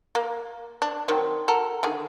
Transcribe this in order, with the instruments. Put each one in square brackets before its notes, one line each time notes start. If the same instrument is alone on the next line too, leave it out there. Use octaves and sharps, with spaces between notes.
[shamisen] A#3
D4
D#3 F#3 C4
F#4 A4 A#4
D3 D#3 G#4